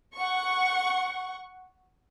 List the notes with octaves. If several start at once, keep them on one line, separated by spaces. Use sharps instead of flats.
F#5 C#6